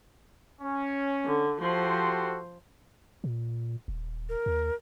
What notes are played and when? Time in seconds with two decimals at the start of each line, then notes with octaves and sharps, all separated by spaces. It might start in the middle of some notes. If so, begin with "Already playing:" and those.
0.62 C#4
1.25 D3
1.61 F3 F#4 G4 A4 C5
3.24 A#2
3.88 D#1
4.29 A#4
4.46 D#2